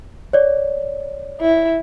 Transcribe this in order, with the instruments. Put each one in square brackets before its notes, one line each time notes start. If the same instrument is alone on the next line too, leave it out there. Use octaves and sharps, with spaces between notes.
[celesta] C#5 D5
[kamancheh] E4